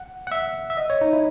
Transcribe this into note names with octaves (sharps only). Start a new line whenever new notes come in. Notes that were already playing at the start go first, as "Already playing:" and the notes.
Already playing: F#5
F#5
E5
E5
D#5
C#5
D#4
E4